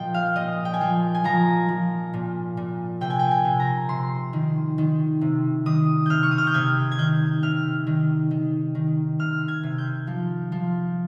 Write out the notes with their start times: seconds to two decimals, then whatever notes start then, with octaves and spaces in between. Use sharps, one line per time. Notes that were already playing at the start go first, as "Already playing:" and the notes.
Already playing: A#2 F3 D#5 G5
0.14 F5
0.36 A#2 D#5
0.65 G5
0.74 G#5
0.81 F3 G5
1.14 G#5
1.24 F3 A#5
1.69 F3
2.13 A#2
2.57 A#2
3.01 C3 G5
3.10 G#5
3.19 G5
3.31 G#5
3.45 C3
3.60 A#5
3.89 C3 C6
4.33 D#3
4.78 D#3
5.21 C3
5.66 D#3 D#6
6.06 C3 F6 G6
6.23 C#6
6.31 D#6
6.38 F6
6.47 G6
6.54 C3 G#6
6.92 G#6
6.98 D#3 G6
7.43 C3 F6
7.87 D#3
8.31 D#3
8.75 D#3
9.19 C3 F6
9.48 G#6
9.63 C3
9.78 G6
10.07 F3
10.52 F3